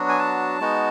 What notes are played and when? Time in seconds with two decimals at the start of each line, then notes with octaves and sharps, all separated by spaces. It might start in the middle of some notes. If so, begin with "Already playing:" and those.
Already playing: F#3 B3 D4 F#4
0.09 G#5
0.19 A5
0.60 G#3 B3 D#4 F#4